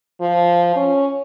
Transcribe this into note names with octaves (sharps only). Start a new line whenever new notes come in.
F3
C#4